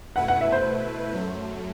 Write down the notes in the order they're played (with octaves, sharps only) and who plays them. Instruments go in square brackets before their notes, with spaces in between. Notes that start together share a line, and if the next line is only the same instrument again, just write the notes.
[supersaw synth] B2 A3 E4 B4 [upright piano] F#5
[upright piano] F#5
E5
C5
[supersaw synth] F#2 F#3 A3